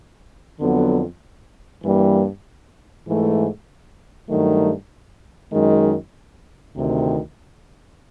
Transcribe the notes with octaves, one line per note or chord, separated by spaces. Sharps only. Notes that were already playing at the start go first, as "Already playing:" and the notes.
F2 D3 F#3 B3
G2 E3 G3 A#3
G#2 E3 A3
G2 D#3 F#3 A3
F#2 D#3 G#3
D2 C3 D#3